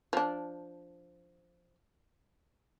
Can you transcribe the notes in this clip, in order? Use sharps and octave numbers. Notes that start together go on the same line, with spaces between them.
F3 D4